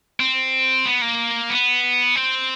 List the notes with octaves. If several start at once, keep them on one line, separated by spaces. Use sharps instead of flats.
C4
B3
A#3
B3
C4